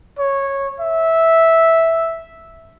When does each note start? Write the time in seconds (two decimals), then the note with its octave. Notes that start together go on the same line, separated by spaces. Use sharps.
0.19 C#5
0.80 E5